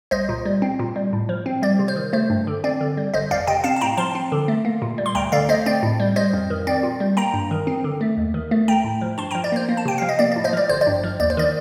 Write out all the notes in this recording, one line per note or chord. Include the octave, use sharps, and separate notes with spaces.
C2 C5 D#5
A#2
G3
C4
A#2
G3
A2
F3
C4
G3 D5
C3
C5
D#3
A3 C5
G2
D3
C4 D5
D3
G3
G1 C5 D#5
F2 D5 F5
C3 D#5 G5
C4 F5 A5
A5
A2 G5 A#5
F3 A5 C6
C4
D3
A3
A#3
A#2
G3
C6
D2 G5 A#5
D3 D5 F5
A3 C5 D#5
C4 D5
A2
G3
G3 C5 D#5
F2
D#3
C4 D5
A#2
G3
A#3 G5 A#5
G2
D#3
C4
D3
A3
D#2
D#3
A3
A3 G5 A#5
A2
F3
G2 A5 C6
G5 A#5
F3
D5
A#3 C5
A#3
A5
C3 G5
F3 F5
D#5
A#3 D5
D5
A2
C5 D#5
F3 D5
G1 C5
D5
G2
F3
D#2 D5
C5
D#3 D5